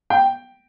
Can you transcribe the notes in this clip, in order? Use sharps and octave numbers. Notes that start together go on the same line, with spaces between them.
G5